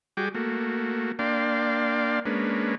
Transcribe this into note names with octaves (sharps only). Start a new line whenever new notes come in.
G3 F#4 G#4 G5 D6
A3 A#3 F#4
A#3 D4 D5 F5 G5 C6
G#3 A#3 C#4 D4 B4